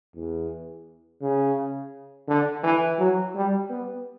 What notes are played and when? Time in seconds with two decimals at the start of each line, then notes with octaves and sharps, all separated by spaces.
0.15 E2
1.21 C#3
2.28 D3
2.63 E3
2.99 F#3
3.35 G3
3.69 B3